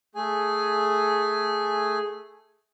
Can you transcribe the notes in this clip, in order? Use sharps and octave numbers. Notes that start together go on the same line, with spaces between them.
A3 G#4 G#5